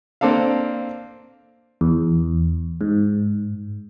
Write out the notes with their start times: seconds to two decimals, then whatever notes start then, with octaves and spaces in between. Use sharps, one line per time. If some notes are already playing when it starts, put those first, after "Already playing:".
0.21 A#3 C4 D4 A4 F5
1.81 E2
2.81 G#2